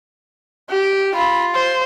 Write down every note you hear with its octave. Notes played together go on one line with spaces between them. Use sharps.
G4
F4 B5
C5